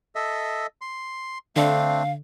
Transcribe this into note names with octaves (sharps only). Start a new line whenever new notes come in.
A4 D#5 E5
C6
D3 A3 C4 D4 F5